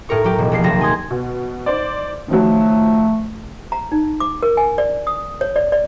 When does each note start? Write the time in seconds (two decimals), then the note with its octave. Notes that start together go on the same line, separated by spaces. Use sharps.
0.09 A2 G4 A#4 C#6
0.24 F#3 G4
0.38 E1 B2
0.52 A#1 A#3 C7
0.64 D#1 C3 F#3 C4 A#6
0.81 G#5 C6 D#6 G#6
1.10 B2
1.66 D#4 C5 D5
2.28 D#3 F3 F#3 A3
3.72 A#5
3.92 D#4
4.20 D6
4.43 A#4
4.57 G#5
4.78 D5
5.07 D#6
5.41 C#5
5.56 D5
5.72 D5